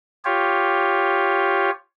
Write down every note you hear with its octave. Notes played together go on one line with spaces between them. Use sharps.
F4 G4 C#5